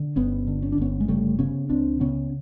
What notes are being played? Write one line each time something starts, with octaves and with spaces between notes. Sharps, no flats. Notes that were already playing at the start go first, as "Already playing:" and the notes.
Already playing: D3
G1 B3 C#4
D3
C#4
D4
G1 B3 C#4
G#3
C#3 G3 A3
C#3 B3 C#4
C#2 C4 D4
C#3 B3 C#4